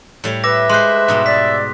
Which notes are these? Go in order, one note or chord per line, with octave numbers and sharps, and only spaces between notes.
A2 G3 C#5
B4 E5 D6 A#6
G#3 C5 C6 F#6
G#2 B2 G3
D5 B6